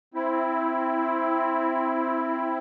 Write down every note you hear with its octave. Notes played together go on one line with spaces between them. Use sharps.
C4 E4